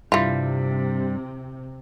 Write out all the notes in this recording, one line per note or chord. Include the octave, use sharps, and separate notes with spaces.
G2 C3 E3 G3 F4